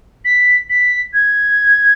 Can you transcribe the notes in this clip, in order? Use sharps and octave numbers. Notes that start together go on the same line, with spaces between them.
B6
B6
G#6